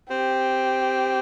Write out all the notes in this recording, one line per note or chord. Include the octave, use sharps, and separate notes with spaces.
C4 G4